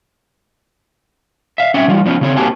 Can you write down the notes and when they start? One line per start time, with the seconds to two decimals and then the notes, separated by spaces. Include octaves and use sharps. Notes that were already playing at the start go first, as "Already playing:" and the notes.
1.58 E5 F5
1.74 C4 C#4 E5 F#5
1.88 E3 G3 F4
2.06 F3 B3 C#4 F4
2.21 C#3 C4 C#5
2.36 A#3 C4 F#4 G4 G#5 A5